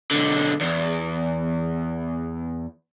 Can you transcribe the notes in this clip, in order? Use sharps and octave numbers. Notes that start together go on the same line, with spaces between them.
B1 D3
E2